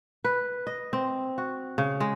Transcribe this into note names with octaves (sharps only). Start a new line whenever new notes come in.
B4
D#5
C4
F#4
C#3
G#3